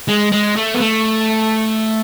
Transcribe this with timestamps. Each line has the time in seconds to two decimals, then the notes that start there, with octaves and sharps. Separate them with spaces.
0.08 G#3
0.32 G#3
0.56 A3
0.74 B3
0.80 A3